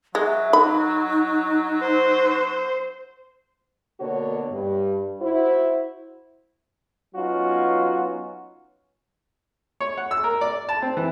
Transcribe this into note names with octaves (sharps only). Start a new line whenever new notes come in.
F#3 G#3 E5
D#4 B5
C5
B2 D3 A#3 F#4 C#5
G2
E4 F#4 C5
F#3 B3 C#4 D#4 F4 F#4
C#5
F#5
E6
A#4
D5
A5
C4
E3